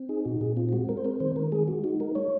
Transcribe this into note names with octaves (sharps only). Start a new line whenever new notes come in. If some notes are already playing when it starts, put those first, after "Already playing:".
Already playing: C4
D#4 G#4
A#2 F#4
A#2 G#4
C4 F4
F4
G#3 F#4
G#3 A#4
C5
C4 A#4
D#3 C5
D#3 A#4
G#3 G#4
G#3 F#4
D#4 F#4
G#3 A#4
G#3 C#5